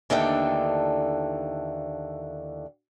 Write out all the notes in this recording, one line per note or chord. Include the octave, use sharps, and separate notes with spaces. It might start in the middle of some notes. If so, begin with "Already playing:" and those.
D#2 D3 E3 A3 D4 G5